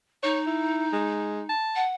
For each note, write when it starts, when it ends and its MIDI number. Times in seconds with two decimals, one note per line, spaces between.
0.23 1.50 63
0.23 0.40 73
0.47 0.87 64
0.93 1.42 56
1.49 1.84 81
1.75 1.95 78